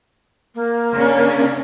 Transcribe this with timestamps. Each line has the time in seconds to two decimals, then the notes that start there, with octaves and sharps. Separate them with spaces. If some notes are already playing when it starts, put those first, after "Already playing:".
0.55 A#3
0.93 C#3 C#4 D4